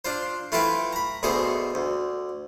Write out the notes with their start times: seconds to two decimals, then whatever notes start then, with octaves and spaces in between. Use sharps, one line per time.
0.05 D4 F4 C5
0.52 A3 E4 F4 A4 B4 G5
0.93 A#5 B5
1.23 D2 B2 A3 G#4 A4 C5
1.75 D2